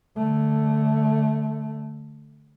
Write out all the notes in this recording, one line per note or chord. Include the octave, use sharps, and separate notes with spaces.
D3 A3